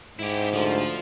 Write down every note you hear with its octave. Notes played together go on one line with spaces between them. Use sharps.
G#2 E4 G4
D2 F3